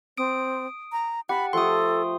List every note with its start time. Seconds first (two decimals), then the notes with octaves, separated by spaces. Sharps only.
0.18 C4 D#6 D7
0.92 A#5
1.29 G4 F#5 A5 B5
1.53 F3 A3 G4 A4 C6 D#6